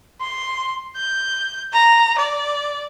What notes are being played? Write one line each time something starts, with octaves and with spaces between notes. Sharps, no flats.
C6
G6
A#5
D5